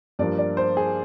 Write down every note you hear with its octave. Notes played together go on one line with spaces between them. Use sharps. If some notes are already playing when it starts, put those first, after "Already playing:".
G2 F3 A#3 D4 D5
D5
C5
G#4